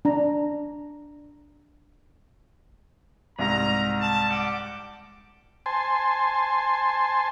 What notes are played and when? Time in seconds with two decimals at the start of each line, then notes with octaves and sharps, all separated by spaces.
0.05 D4 A#5
3.39 C2 G#2 A#5
4.00 A5
4.29 G4 F#5 D6
5.66 C5 G#5 A5 C6